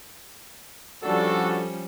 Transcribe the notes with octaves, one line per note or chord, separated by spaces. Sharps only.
F3 G3 C#4 D4 F#4 A4